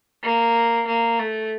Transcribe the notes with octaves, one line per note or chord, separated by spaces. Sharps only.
A#3
A#3
A3